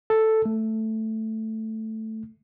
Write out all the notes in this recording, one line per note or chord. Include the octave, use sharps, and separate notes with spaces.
A4
A3